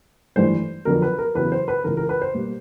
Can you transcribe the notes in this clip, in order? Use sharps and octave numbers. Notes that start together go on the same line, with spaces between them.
G#1 G2 E3 A3 C5
F2 D3 F#3 B3 A#4
B4
A#4
E2 C#3 F#3 B3 B4
C5
B4
C#2 C#3 E3 A#4
A#4
B4
C5
B2 G3 A#3